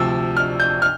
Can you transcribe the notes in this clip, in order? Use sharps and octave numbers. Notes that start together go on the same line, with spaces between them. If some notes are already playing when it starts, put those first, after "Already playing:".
Already playing: D2 C3 F3 E6
F6
G6
F6